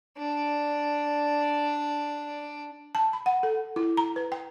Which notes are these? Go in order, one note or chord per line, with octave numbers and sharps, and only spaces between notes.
D4 D5
A5
B5
F#5
A4
E4
A#5
B4
G5